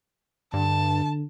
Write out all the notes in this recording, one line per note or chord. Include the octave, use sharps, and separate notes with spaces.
G2 D3 A5